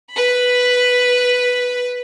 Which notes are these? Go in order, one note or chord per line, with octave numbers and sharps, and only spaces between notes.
B4 B5